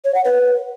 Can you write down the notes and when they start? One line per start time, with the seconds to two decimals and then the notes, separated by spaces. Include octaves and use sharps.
0.05 C#5
0.15 F#5
0.25 B4